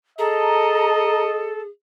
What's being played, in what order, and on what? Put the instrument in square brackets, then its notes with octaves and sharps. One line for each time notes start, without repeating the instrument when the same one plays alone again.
[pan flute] G#4 [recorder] A4 [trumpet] D#5 [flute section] A5 A#5